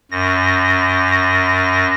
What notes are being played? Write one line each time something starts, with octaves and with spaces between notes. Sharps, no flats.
F#2 A#6